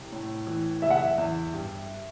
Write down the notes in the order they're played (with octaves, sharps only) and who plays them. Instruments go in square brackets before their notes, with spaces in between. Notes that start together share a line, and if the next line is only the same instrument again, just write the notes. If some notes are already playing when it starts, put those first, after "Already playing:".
Already playing: [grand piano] C2 G3
A2
E3
[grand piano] F#1 [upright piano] E5
[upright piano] F#5
E5
[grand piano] E2
G2